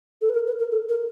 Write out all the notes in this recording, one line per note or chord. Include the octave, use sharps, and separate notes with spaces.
A4
B4
A#4
B4
A#4
A4
A#4